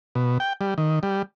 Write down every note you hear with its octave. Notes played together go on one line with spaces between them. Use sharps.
B2
G5
G3
D#3
G3